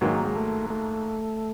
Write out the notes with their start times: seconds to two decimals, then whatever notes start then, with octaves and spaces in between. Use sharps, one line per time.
0.01 G#2 D#3 F#3 G#3 A#3
0.25 G#3
0.36 A3
0.70 A3